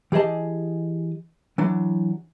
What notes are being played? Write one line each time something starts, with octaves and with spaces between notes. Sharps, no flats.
E3 G4 G#4 D#5 A5
E3 F#3 D4